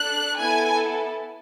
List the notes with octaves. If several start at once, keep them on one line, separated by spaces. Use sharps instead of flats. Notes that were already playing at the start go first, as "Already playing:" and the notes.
Already playing: D4 A4 F#6
B3 E4 A4 G#5